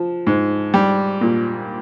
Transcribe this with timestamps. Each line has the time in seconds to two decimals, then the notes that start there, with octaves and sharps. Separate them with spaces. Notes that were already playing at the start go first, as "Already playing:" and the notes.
Already playing: F3
0.27 G#2
0.74 G3
1.21 A#2